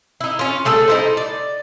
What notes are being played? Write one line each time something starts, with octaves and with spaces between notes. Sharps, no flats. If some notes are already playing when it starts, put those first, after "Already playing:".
D#4 E4
C#4 F4
G3 A3 G#4 A4
D#4 E4 C5
D5